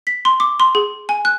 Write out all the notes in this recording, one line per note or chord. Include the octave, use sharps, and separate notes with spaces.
B6
C6
D6
C6
G#4
G#5
F#6